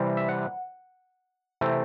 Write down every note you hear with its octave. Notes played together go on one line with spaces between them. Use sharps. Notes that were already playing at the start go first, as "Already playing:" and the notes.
Already playing: C3 E3 G3 C4
E5
F#5
C3 E3 A3 C4